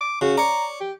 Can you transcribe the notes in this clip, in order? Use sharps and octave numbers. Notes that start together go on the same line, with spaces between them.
D6
C#3 F#4
C#5 D5 A#5
G4